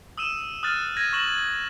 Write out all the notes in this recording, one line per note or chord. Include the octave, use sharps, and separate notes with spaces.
D#6 E6 D#7 E7
D#6 F6 F#6 A6 D#7
G#6 A#6 D#7
C#6 A#6 E7 F#7